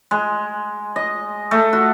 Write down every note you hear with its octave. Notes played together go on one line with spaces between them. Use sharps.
G#3
D#5
A3
F#4